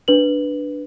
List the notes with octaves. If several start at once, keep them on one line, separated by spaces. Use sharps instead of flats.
D4 B4 F#7